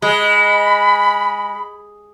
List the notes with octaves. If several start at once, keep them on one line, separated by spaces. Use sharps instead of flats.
G#3 B5